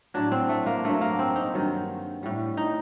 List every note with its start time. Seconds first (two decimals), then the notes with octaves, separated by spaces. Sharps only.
0.14 A2 F#3 D4
0.32 C4
0.49 A3
0.66 A#3
0.84 G2 F#3 A3
1.01 A#3
1.19 C4
1.36 D#4
1.54 G2 D#3 F#3
2.23 A2 G3
2.57 D#4